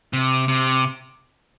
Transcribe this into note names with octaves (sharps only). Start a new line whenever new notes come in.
C3
C3